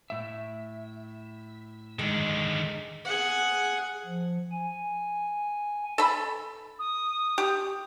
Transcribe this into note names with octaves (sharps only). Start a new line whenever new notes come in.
A2 E5
D3 D#3 G#3
G#4 F#5
F3
G#5
A4 B5
D#6
G4